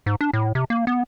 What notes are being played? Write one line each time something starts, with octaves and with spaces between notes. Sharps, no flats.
G#2
D4
A2
C3
A#3
B3